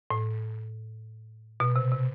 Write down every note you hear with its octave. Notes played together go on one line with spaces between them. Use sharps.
A2
B2
C3
C3